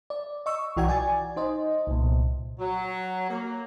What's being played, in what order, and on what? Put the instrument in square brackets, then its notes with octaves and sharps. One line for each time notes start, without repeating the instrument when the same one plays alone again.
[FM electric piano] D5
D#5 C#6 E6
B1 E3 F#4 D5 G5 G#6
D5 G#5 A6
D#4 C5 D#5
C2 A#2
[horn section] F#3
A#3